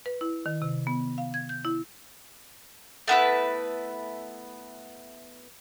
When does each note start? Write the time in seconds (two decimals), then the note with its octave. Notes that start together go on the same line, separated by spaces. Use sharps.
0.06 B4
0.21 E4
0.46 D#3
0.62 C3
0.87 B3
1.18 F5
1.34 G#6
1.49 G6
1.65 E4
3.08 A3 B3 E4 B4